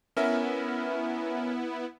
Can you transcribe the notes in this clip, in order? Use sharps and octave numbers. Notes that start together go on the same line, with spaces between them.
B3 C#4 E4 A#4 E5